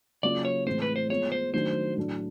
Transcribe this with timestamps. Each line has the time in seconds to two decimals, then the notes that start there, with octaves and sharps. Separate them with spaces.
0.23 C#3 F#3 A#3 C#4 F4 D5
0.45 C#5
0.66 A2 E3 G#3 C4 C5
0.82 B4
0.96 C5
1.10 F3 G#3 B3 C#5
1.32 C5
1.54 D#3 F#3 A3 D4 F#4 C5
1.96 A2 F#3 A3 D4